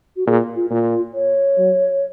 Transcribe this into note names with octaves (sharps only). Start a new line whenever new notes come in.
F#4
A#2 G#4
F4
A#2 F4
C#5
F#3